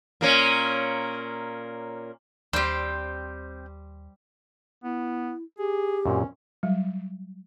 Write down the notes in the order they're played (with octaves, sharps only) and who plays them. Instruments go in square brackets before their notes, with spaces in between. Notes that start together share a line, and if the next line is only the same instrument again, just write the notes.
[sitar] A#2 A#3 C#4
[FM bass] D#2 [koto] G3 G4 [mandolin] C4 G5 [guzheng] C5
[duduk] B3 [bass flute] E4
[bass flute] G4 [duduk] G#4
[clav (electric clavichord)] F#2 A#2 C4 [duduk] C#4
[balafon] F#3 G3